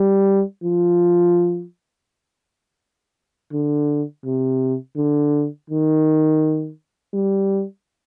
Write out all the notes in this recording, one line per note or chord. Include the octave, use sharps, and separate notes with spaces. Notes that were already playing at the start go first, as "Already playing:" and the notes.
Already playing: G3
F3
D3
C3
D3
D#3
G3